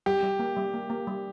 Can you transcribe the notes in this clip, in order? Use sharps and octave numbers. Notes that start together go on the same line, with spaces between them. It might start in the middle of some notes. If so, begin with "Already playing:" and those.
G3 G4
G3
A#3
G3
A#3
A#3
G3